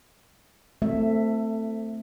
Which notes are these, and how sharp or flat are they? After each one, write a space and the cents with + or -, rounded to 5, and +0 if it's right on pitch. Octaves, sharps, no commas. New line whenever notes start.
A3 +20 C4 +0 E5 +0